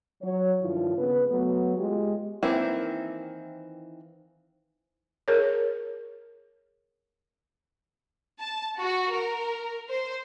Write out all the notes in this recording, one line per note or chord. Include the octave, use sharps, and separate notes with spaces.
F#3 C#5
G2 D#3 F3 E4 F4
C#3 B3 B4
F#3 A3 B3
G#3 F4 G4
D#3 E3 A#3 C4 E4
G#4 A#4 C#5
A5
F#4
A#4
C5